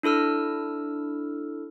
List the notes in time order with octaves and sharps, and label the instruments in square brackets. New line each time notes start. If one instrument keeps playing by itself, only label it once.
[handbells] D4 E4 A4 E6 F6